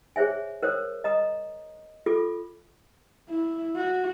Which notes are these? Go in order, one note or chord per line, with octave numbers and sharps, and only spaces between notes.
G#4 C5 C#5 E5 G#5
A#4 C5 C#5 D#6
D#5 A#5 D#6
F4 A4 D6
E4
F#4